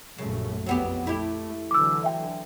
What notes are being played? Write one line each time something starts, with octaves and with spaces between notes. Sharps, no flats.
A#1 F#2 C#3 A3
A#1 F2 F#3 B3 G4
A3 E4 G4
D3 E3 F#3 D6 E6
E5 G5